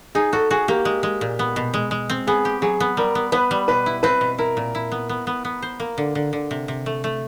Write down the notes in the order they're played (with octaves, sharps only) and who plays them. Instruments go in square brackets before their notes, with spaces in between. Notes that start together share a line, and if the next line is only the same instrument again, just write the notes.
[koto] D#4 [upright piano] G#4
[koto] F#4 [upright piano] A4
[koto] F#4 [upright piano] G#4
[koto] A#3 [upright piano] G4
[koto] G#3
G#3
A#2
B3
B2
G#3
G#3
C4
[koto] B3 [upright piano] G#4
[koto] G4
[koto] F#3 [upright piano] G#4
[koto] B3
[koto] G3 [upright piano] A#4
[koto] B3
[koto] B3 [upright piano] B4
[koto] G3
[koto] B2 [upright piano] B4
[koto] E4
[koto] C4 [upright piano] B4
[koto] B2
[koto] E4 [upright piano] A#4
[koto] A#2
E4
B3
B3
B3
B3
C5
A#3
D3
D3
D3
C3
C3
A3
A3